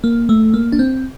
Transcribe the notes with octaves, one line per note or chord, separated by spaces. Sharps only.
A#3
A3
A#3
D4
C4